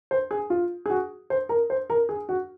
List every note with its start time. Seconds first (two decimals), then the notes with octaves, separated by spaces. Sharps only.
0.11 C5
0.31 G#4
0.50 F4
0.86 G#4
0.90 F#4
1.30 C5
1.49 A#4
1.70 C5
1.90 A#4
2.09 G#4
2.29 F#4